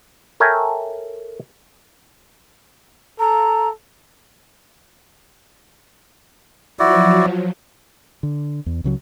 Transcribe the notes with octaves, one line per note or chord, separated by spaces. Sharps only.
A4 A#4 C#5 E5 G5 G#5
A4 A#5
F3 F#3 E4 F#4 D5
D3
E2
C#2 C#3 F#3